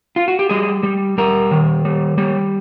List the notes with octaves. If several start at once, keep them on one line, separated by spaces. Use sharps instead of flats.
F4
F#4
G4
G3 G#4
G3
G3 A#4
D#3
G3
G3